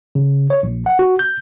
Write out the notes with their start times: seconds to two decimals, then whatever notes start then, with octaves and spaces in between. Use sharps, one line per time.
0.15 C#3
0.50 C#5
0.63 A#1
0.86 F#5
0.99 F#4
1.19 G6